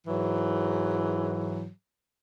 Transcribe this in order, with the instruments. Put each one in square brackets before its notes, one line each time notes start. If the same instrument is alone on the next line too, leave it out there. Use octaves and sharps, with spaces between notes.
[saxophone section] G#2 E3 F#3